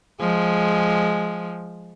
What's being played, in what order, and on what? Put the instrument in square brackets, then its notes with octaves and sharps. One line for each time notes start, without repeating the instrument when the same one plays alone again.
[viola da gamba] F3 G#3